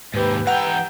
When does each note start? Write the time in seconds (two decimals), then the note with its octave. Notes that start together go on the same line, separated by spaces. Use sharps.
0.14 D#2 G#2 G4 B4 E6
0.47 E3 F#5 G5 A#5